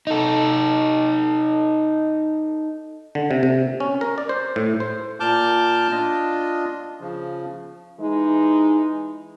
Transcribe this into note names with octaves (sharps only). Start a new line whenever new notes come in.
D#4 A4
D3
C3
C3
C#4
A#4
D5
C5
A2
C5
A#2 A5 D6 F6 G6
D4 F4 D#5
C#3 F3
E3 G#3 D#4